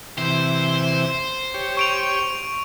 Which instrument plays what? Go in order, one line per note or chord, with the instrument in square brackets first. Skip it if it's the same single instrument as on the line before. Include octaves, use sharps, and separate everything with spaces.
[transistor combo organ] C3 E3 [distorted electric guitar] C5
[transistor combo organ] G4 C#5
[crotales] C#6 D7 F7